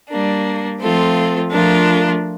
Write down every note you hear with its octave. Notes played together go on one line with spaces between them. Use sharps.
G3 A#3 D4
F3 A3 C4 F4 A4
F3 A3 D4 F4 A#4